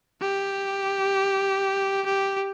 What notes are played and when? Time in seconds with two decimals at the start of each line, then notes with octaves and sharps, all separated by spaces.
0.21 G4
2.06 G4